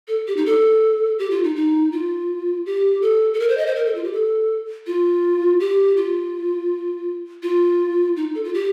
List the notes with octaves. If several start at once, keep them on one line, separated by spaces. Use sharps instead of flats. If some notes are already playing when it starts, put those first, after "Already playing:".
A4
G4
D#4
A4
G4
F4
D#4
D#4
F4
G4
A4
A4
A#4
C5
D#5
C5
A#4
A4
F4
G4
A4
F4
G4
F4
F4
D#4
A4
F4
G4